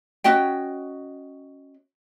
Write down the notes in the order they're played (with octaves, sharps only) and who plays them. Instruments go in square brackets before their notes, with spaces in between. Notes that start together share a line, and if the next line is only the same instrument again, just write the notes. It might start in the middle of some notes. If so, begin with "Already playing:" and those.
[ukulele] C#4 F#4 D#5 G5